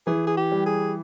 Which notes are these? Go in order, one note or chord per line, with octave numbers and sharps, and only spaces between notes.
E3 G#4
G#4
G4
G3
G#4